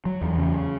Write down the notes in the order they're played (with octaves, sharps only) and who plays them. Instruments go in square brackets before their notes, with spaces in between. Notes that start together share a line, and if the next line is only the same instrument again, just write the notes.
[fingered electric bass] F#3
E2
C#3